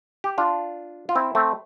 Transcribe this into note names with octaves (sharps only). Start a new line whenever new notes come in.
G4
D4 F4
F4
C4 E4
A3 C4